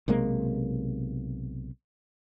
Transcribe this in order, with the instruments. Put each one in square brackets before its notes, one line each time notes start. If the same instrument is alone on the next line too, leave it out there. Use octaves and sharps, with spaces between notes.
[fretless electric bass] B1 C3 G#3 A#3